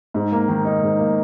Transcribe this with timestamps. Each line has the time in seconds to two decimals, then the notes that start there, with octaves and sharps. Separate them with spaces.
0.14 G#2
0.32 A#3
0.48 D#3
0.65 D#4
0.83 G#2
0.99 A#3